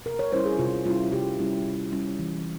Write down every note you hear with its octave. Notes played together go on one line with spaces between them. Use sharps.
C3 A#4
C#5
G3 C#4 E4 C5
G#4
C3 F4
G3 C#4 E4 F4
C3 G4
G3 C#4 E4
C3
G3 C#4 E4
E3